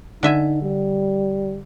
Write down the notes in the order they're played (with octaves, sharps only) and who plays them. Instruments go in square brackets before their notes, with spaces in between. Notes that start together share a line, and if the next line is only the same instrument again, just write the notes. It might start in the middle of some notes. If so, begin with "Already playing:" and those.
[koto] D3 E5 G#5 [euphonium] D#4
[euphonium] G3